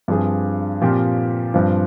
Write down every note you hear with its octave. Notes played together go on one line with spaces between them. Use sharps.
G2 F3 C4 F4 G#4
A#2 F3 C4 G4
G2 F3 C4